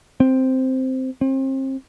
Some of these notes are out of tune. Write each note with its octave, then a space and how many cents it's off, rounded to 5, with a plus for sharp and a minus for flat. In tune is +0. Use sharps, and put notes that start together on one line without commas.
C4 -5
C4 +35